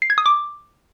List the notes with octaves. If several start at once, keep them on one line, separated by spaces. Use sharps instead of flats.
C7
G#6
D#6
D6